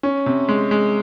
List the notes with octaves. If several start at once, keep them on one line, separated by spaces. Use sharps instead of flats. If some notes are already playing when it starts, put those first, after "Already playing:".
C#4
C3
G#3
G#3